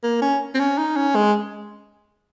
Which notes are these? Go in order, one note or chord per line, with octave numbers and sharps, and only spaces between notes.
A#3
C#4
C4
C#4
D#4
C#4
G#3